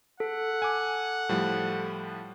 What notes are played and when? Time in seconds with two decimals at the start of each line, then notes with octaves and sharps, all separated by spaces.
0.20 A4 F#5
0.62 G#5 D6
1.29 A2 F3 G3